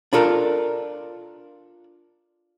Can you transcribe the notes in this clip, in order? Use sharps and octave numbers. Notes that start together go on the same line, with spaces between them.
D4 F4 A4 A#4